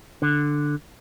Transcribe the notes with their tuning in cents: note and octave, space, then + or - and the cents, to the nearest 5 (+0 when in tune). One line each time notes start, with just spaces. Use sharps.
D3 +5